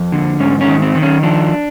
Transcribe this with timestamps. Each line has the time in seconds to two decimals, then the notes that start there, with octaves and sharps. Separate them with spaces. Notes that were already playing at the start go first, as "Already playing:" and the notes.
Already playing: F2
0.12 D3
0.40 G#2 C#4
0.61 C#4
0.67 D#3
0.82 C4
0.95 D#3
1.02 C#4
1.23 F3 D4